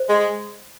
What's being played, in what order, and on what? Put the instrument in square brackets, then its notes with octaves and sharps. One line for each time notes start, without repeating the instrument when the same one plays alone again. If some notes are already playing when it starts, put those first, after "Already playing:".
Already playing: [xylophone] C5
[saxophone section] G#3